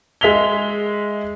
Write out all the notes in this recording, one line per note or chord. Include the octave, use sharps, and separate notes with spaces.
G#3 E5 B6 F7 G7